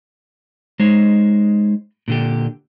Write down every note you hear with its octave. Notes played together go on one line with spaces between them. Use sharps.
G#3 D#4 C5 C#5
A#2 D3 G4